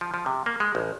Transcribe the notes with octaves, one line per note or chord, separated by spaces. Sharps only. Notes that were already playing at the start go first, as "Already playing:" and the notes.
F3
F3
C3
A#3
G#3
A1